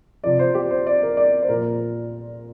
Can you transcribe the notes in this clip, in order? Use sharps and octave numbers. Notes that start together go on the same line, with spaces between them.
C3 F3 D5
C5
G4
C5
D5
A#4
D5
C5
A#2 F3 A#4